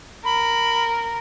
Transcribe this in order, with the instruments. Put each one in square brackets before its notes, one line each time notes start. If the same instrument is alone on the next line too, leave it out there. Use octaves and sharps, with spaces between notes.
[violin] A#4 [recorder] B5